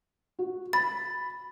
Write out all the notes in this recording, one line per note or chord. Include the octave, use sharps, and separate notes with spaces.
F#4
B5 A6